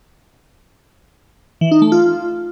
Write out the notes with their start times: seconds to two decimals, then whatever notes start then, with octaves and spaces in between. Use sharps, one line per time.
1.61 E3
1.71 D#4
1.82 A3
1.92 F4